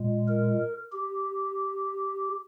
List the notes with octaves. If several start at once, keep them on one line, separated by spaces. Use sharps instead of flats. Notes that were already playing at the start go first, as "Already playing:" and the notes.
Already playing: A#2 G#3
A#4
G4